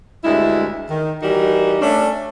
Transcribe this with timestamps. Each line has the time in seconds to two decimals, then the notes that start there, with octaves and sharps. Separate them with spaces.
0.24 D2 G2 G#3 E4
0.90 D#3
1.22 E3 G3 D#4 F#4 A#4
1.81 A3 C#4 D4